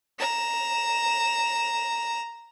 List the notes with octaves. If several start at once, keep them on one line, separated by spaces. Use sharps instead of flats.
A#5 E7